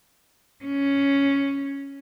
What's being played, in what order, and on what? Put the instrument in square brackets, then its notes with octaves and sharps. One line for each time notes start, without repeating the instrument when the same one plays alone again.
[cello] C#4